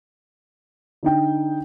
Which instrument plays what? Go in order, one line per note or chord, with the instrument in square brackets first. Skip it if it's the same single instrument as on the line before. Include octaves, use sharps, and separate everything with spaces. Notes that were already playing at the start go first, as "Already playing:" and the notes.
[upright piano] D3 D#4 G5